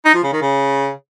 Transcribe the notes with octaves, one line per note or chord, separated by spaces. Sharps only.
D#4
F3
C#3
D#3
C#3